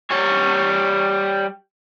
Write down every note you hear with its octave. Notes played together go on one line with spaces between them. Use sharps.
G3 C#5